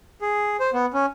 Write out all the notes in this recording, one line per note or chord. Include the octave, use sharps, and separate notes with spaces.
G#4
C5
B3
C#4